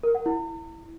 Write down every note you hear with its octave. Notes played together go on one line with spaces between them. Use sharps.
A#4
F#5
E4